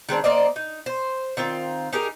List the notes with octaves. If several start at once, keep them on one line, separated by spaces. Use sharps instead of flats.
D#3 G#3 C4 D4
A#3 C5 D5 D#5
D#4
C5
D#3 C4 F4
D#4 G4 G#4 A#4